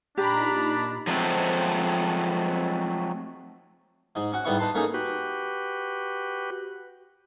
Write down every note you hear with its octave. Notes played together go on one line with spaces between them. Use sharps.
A#2 D4 D#4 G4 A#5 B5
F3 F#3 G#3 A3 C4
G#2 G#3
C#4 F#4
G#2 G3 B3 E4 C#6
D#4 B4 A5 C6
A3 A#3 C#4 D#4 G#4
F#4 G4 B4